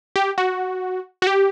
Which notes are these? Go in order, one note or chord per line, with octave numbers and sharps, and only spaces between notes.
G4
F#4
F#4
G4